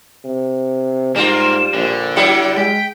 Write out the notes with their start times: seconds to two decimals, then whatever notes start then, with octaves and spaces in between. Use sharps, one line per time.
0.25 C3
1.16 G#2 G3 A#3 F4 A#4 E7
1.74 A#1 D3
2.16 F#3 G3 E4 C#7
2.57 G#3 G5 B6